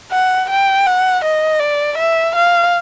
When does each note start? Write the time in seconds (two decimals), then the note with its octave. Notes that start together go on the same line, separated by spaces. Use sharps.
0.11 F#5
0.49 G5
0.86 F#5
1.24 D#5
1.60 D5
1.97 E5
2.35 F5